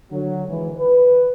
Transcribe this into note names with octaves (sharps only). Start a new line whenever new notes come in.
D3 F#3
G#1 E3
B4